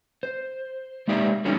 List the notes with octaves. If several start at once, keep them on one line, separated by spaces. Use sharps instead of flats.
C5
G#3 A#3 D#4 G4 D5 E5
D3 F#3 G3 A3 C#4 D#4